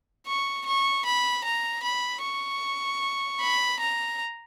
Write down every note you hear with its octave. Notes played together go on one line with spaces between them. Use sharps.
C#6
C#6
B5
A#5
B5
C#6
B5
A#5